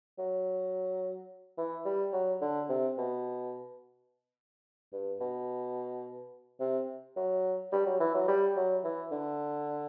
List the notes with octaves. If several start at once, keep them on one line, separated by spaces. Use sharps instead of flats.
F#3
E3
G3
F#3
D3
C3
B2
G2
B2
C3
F#3
G3
F#3
E3
F#3
G3
F#3
E3
D3